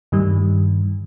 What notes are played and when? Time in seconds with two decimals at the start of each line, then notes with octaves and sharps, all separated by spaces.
0.12 G2 D#3 G3